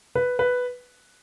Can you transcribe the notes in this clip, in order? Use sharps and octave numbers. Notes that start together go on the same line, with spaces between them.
B4
B4